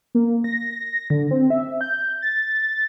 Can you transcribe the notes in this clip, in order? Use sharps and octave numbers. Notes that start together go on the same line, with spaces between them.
A#3
A#6
D3
C4
E5
G6
A6